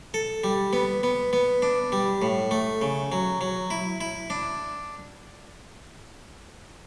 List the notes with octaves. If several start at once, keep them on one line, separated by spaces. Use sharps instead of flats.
A4
G3
B3
B3
B3
D4
G3
A2
A3
C#3
F#3
F#3
E4
E4
D4